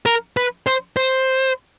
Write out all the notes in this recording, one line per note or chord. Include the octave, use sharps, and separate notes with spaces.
A#4
B4
C5
C5